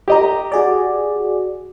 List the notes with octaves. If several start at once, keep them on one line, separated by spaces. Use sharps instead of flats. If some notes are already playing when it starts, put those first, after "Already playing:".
G4 D#5 A#5
F#4 G#4 D5